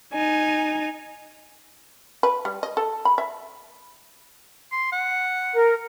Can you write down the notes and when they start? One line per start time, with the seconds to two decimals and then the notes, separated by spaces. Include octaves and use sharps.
0.13 D#4 G#5
2.23 B4
2.45 G3
2.63 D#5
2.77 A4
3.05 B5
3.18 E5
4.72 C6
4.92 F#5
5.53 A#4